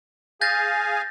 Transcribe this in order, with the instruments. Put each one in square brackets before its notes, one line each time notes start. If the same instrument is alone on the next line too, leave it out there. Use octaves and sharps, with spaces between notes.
[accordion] G#4 F5 G#5 [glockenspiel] G6 A6 A#6